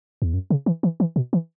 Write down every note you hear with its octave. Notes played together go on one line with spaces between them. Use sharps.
E2
F#2
C#3
E3
E3
E3
B2
E3